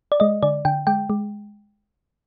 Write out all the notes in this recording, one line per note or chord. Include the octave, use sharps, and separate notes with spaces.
D5
G#3 D#5
D3 D5
D3 G5
G#3 G5
G#3